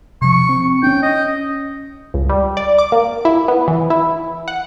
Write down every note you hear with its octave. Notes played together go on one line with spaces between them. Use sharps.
C3 F3 C#6
C4
C#4 D4 G5
D#5
C#2
G3
D5
D6
A#3
E4
B3
E3
E4
F#5